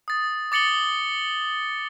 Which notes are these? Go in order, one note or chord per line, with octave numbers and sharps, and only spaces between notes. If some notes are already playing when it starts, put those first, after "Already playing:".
D#6 A6
D6 A6 C#7 F#7 G7